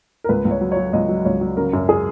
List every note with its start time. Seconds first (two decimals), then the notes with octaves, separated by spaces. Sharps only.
0.24 A#4
0.29 C#2 B4
0.45 C#2
0.51 C#5
0.61 F#3
0.72 C#5
0.77 F#3
0.93 C#2 D#5
1.09 F#3
1.25 C#2 C#5
1.41 F#3
1.57 C#3 A#4
1.73 F#2
1.89 G#4